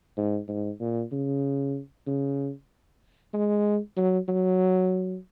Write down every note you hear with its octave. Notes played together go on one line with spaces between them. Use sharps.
G#2
G#2
A#2
C#3
C#3
G#3
F#3
F#3